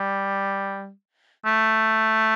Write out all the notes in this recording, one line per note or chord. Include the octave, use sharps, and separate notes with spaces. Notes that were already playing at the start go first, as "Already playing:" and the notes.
Already playing: G3
A3